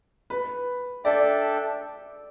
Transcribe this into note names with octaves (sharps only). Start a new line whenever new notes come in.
B4
D4 A4 D5 E5 G5